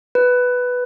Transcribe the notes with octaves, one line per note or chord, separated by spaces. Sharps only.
B4